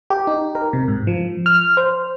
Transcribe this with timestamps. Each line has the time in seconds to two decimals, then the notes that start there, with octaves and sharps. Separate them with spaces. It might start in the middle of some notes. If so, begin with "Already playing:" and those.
0.10 G4
0.27 D#4
0.55 A#4
0.73 C3
0.88 G#2
1.07 F3
1.46 F6
1.77 C5